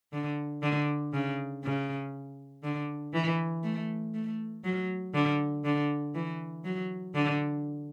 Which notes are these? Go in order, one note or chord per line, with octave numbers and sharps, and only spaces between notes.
D3
D3
C#3
C#3
D3
E3
A3
A3
F#3
D3
D3
E3
F#3
D3